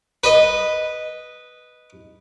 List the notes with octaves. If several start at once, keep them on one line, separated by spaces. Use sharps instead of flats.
B4 D#5